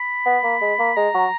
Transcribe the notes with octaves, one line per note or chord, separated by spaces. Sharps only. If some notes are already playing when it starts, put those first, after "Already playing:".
Already playing: B5
B3
A#3
G#3
A#3
G#3 A#5
F#3